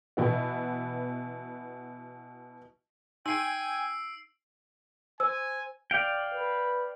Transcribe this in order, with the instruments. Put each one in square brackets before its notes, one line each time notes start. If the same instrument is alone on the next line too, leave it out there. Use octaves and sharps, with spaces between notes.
[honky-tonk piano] B2 E3 B3
[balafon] D#4 [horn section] G5 G#5 [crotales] E6 C7 D7
[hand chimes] C5 [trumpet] G#5 [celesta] E6
[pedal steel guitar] D5 F5 G5
[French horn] B4